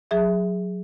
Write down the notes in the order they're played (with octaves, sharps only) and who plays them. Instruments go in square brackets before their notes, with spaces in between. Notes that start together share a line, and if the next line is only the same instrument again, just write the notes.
[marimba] F#3 G#4 E5